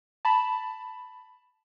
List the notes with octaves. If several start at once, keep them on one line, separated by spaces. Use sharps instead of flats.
A5 B5